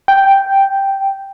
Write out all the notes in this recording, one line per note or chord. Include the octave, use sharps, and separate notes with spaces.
G5